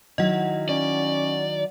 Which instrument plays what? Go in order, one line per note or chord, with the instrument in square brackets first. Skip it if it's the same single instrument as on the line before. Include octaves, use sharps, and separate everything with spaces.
[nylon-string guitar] D#3 F#3 E4 [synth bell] D#5 F#5
[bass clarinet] C#4 [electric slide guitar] D5